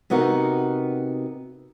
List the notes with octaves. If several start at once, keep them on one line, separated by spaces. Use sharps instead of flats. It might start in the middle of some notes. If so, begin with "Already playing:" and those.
C3 B3 D#4 F#4 A#4